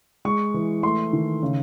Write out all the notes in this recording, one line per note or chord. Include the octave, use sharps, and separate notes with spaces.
G#3 C#6
E3
A3 C6
D#3
C#3